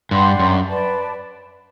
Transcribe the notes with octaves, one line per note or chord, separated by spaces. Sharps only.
G2 G4 D5 F#5 C6
F#2
B4 D5 A5